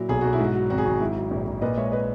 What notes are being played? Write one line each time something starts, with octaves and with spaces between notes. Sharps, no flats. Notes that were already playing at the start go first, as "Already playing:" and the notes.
Already playing: A#2 F#3 E4
B1 G#4
B1 F#4
E4
G#2
F#4
F#3
G#1 F#4
G#4
G#1 F#4
G#2 E4
F#3
A#1
A#1
A#2 B4 D#5
G#3 C#5 E5
B4 D#5